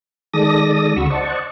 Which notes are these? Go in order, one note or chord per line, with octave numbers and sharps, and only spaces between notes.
D#3 G#3 A4 D5 D#6 A#6
D2 C#3 F#4 B5 C#6 E6
C5 D5 D#5 F#5 A5 C#6